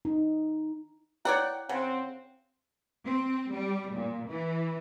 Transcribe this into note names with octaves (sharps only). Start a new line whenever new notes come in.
D#4
E4 C#5 D5 F#5 G5
C#3 C4 F#5
C4
G3
A#2
E3